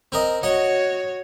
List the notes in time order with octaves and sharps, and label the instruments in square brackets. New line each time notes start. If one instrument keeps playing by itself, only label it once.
[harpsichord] C4 A#4 D#5
[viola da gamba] F#4 C#5 [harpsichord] D#5 F#5